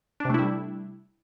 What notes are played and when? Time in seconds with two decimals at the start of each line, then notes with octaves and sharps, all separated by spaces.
0.20 D4
0.25 C3
0.30 A3
0.34 E4
0.39 G3